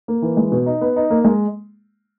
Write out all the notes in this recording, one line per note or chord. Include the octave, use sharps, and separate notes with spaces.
A#3
E3
G#3
B2
D#4
B3
D#4
A#3
G#3